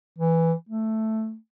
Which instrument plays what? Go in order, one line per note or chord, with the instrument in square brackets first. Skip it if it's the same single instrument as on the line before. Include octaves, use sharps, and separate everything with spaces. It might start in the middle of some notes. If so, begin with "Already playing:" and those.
[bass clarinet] E3
A3